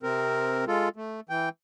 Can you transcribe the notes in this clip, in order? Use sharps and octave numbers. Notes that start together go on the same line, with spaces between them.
C3 C4 A#4
G#3 F4 A4
A3
E3 G5